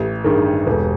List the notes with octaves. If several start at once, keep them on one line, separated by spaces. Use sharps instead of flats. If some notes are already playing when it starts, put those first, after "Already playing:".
Already playing: A1 G4 A4
G2 D#3 G#4 A#4
E1 A4 B4